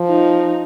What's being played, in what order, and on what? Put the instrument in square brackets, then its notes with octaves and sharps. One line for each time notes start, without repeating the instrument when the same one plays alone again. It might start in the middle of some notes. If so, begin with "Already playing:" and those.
Already playing: [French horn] F3
[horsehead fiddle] D#4